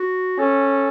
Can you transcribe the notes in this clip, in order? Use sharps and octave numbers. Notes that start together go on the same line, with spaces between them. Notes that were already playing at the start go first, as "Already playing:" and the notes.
Already playing: F#4
C#4 A4